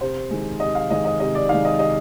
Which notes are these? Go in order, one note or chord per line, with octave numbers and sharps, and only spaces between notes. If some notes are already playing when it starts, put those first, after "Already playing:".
C3 C5
D#3 G#3
C3 D#5
F5
D#3 G#3 D#5
D#5
C3 D#5
D5
D#3 G#3 F5
D#5
C3 D#5